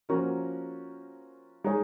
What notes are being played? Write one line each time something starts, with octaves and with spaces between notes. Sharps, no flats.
F3 A#3 C#4 F#4 A#4
G#3 D#4 G#4 C#5